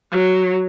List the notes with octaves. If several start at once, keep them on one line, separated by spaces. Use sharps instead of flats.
F#3